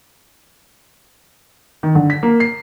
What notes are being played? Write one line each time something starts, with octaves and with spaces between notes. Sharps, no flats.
D#3
D3
B6
A#3
C7